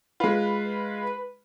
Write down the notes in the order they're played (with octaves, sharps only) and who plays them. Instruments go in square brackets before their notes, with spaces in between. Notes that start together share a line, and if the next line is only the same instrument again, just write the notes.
[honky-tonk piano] G#3 F4 [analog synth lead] B4